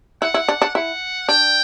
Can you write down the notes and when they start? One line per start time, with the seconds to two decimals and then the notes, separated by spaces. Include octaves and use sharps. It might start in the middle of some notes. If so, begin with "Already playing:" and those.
0.22 E4 F#5
0.34 E4
0.49 D4
0.62 D4
0.75 E4 F#5
1.29 D4 G5